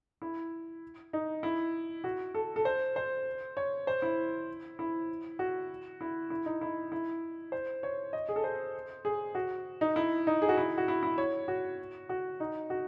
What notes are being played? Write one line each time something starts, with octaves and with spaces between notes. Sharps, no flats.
E4
D#4
E4
F#4
A4
A4
C5
C5
C#5
C5
E4
E4
F#4
E4
E4
D#4
E4
E4
C5
C#5
D#5
G#4
A4
C5
G#4
F#4
D#4
E4
D#4
G#4
F#4
E4
F#4
E4
E4
C#5
F#4
F#4
D#4
F#4